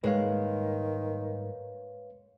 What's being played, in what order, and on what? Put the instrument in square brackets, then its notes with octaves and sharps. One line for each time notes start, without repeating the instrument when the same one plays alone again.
[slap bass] G#2 G3 A#3 [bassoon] D#3 [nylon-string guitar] G#3 [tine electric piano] B4 C#5 F5